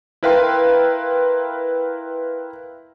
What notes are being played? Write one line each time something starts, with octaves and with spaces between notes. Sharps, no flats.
E4 A#4 B4 F5 G5 C6